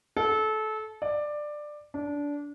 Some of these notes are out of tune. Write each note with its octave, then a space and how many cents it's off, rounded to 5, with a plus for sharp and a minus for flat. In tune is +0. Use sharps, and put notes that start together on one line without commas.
A4 -25
D5 +15
D4 -20